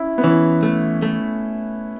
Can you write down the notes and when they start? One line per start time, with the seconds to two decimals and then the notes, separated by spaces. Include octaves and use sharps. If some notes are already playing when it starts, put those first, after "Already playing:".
Already playing: C#4 E4
0.18 B3
0.23 E3 C#4
0.63 A3
1.02 A3